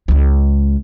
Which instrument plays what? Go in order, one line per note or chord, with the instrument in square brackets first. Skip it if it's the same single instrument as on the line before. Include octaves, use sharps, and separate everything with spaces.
[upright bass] C#2 G#3